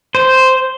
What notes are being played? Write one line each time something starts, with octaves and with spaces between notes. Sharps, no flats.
C5